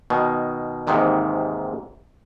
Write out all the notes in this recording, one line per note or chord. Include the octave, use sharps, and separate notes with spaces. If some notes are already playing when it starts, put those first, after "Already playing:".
B2 D#3
D#2 G#2 C3 D#3 E3